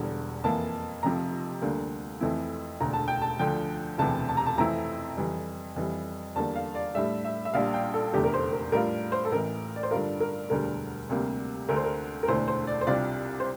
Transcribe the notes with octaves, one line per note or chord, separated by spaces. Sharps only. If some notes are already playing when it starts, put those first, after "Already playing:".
Already playing: E1 E2 D3 G3
F2 E3 A#3 A5
F1 F2 C3 F3 A#5
D2 D3 G3 A#3
F2 E3 A3 C4 E4
E1 D2 D3 A#5
A5
G5
A5
D2 D3 F3 G5
E1 D2 C3 E3 A5
A5
A#5
A5
F2 E3 A3 C4 E4 A#5
F2 E3 G3
F2 E3 G3
E2 D3 G3 A#3 A5
F5
D5
A2 G3 D4 E5
E5
E5
A#1 A#2 G3 D4 F5
G5
A4
F1 E2 D3 A3 G4
A#4
C5
A#4
A2 G3 D4 F4 A#4
C5
A4
A1 A2 E3 A#4
D5
C5
G2 D3 G3 D4 F4 A#4
A#4
E1 D2 D3 G3 A#4
D2 C3 G3 A#3
D2 D3 A3 A#4
C5
A#4
A#4
E1 D2 D3 A3 E4 C5
C5
D5
C5
C2 C3 G3 D4 F4 D5
C5